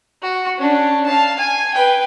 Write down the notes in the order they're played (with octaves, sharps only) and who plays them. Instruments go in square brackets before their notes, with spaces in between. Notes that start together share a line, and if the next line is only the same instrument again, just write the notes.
[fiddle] F#4
C#4 D4
F5 A5
G#5
B4 G5